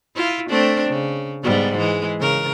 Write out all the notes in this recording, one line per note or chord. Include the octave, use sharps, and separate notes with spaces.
E4 F4
A3 C4 D4
C#3
G#2 G3 B3
E3 G#3
C#3 A#4